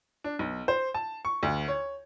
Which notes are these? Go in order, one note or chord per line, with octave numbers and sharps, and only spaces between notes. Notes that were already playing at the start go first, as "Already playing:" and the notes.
D4
B1
C5
A5
C#6
D2
C#5